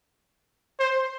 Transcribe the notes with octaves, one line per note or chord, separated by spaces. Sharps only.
C5